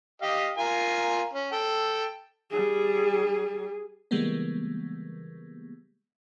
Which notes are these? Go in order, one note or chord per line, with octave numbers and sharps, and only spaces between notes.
G4 D#5 F5
F4 A#4 G#5
C#4
A4 G5
G3 G#4
C#3 E3 G3 G#3 A#3 B3